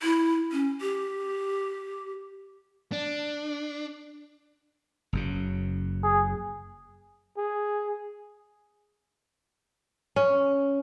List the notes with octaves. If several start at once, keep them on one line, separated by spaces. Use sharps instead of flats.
E4
C#4
G4
D4
F#1 F#2 C#3
G#4
G#4
C#4